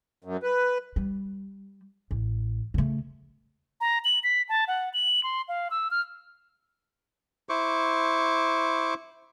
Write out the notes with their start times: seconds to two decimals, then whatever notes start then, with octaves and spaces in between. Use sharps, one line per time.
0.24 F#2
0.43 B4
0.96 G3
2.11 A1
2.74 C#3 A3
3.81 A#5
4.05 F#7
4.24 B6
4.49 A5
4.68 F#5
4.94 F#7
5.24 C6
5.48 F5
5.71 E6
5.91 F6
7.49 E4 C5 C#6 D6